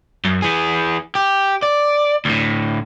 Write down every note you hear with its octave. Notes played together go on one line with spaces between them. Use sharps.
F#2
E3 G#4
G4
D5
D2 A2